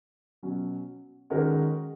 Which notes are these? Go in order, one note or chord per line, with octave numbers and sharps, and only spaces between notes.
B2 F#3 C#4
D#3 G#3 C#4 F#4 A#4